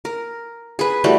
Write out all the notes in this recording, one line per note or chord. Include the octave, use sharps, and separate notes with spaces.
A#4
G#4 B4
E3 G3 A3 F#4